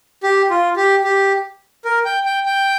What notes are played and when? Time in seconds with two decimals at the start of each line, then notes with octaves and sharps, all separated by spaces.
0.23 G4
0.50 F4
0.77 G4
1.04 G4
1.85 A#4
2.05 G5
2.25 G5
2.46 G5